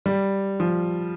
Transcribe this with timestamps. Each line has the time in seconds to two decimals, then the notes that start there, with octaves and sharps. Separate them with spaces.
0.06 G3
0.60 F3